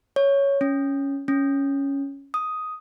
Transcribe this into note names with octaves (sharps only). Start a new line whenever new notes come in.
C#5
C#4
C#4
D#6